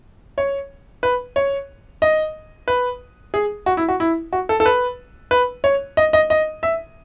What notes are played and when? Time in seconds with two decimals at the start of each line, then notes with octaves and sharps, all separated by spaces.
0.38 C#5
1.03 B4
1.36 C#5
2.02 D#5
2.68 B4
3.34 G#4
3.66 F#4
3.77 E4
3.89 F#4
4.00 E4
4.33 F#4
4.49 A4
4.60 A4
4.66 B4
5.31 B4
5.64 C#5
5.97 D#5
6.13 D#5
6.30 D#5
6.63 E5